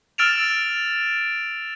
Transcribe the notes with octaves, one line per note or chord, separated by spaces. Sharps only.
E6 F6 A6 D7 E7 F7